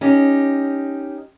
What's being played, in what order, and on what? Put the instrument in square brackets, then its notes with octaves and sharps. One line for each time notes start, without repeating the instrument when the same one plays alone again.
[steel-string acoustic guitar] C#4 D#4 G4